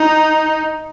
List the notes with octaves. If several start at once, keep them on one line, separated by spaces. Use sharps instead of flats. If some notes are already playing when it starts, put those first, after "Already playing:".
Already playing: D#4